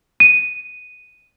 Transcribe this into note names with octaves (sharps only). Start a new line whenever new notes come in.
D#7